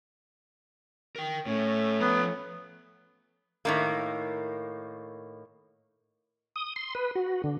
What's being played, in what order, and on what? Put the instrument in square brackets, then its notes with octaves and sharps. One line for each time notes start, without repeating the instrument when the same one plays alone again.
[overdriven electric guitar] A#4 G5
[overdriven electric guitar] A2 [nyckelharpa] A3 C#4
[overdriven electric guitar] F3 A#5 [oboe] B3
[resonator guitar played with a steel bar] A2 D#3 A#3
[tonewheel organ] D#6
C6
B4
F#4
D3